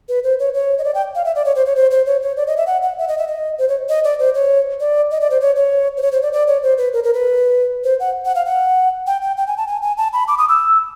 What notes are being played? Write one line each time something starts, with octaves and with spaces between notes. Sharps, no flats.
B4
C5
C#5
C#5
D#5
D5
G5
F5
E5
D5
C#5
C5
C#5
C5
C5
C#5
C#5
D5
D#5
E5
F#5
F#5
E5
D#5
E5
D#5
C5
C#5
D#5
D5
C5
C#5
D5
D#5
D5
C5
C#5
C#5
C5
C#5
C5
D5
D5
C#5
C5
B4
A#4
A#4
B4
C5
F#5
F#5
F5
F#5
G5
G5
G5
G#5
A5
G#5
G#5
A5
B5
D6
D#6
E6